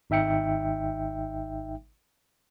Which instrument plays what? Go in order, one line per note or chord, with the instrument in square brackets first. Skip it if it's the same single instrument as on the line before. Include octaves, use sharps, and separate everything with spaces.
[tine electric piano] G#1 D#4 E5 G5 C#7